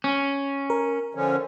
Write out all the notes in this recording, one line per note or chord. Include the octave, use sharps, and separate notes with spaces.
C#4
A#4
D3 F3 C#4